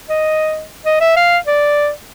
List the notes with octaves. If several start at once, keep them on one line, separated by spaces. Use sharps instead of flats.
D#5
D#5
E5
F5
D5